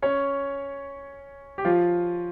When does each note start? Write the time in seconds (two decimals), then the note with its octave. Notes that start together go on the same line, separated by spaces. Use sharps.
0.02 C#4 C#5
1.58 G4
1.65 F3 F4